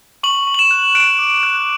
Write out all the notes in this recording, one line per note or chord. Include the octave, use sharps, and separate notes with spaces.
C#6 F#7
C#6
F#7
E7
F#6
F#6 D7
D6
F#6